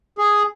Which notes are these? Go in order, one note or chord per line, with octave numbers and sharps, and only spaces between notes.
G#4